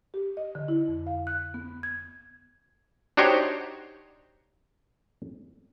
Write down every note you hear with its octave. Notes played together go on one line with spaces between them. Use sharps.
G4
D#5
D3
E4
F2
F5
F#6
B3
G#6
D4 D#4 F#4 G4 C5 C#5